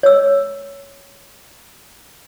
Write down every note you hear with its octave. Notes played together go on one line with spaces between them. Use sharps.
C#5 E6